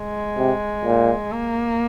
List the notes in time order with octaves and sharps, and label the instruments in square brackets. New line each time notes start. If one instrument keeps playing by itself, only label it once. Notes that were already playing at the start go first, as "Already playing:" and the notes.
Already playing: [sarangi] G#3
[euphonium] C3
A#2
[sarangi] A#3